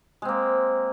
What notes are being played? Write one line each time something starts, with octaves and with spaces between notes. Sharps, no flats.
G#3 A#3 C4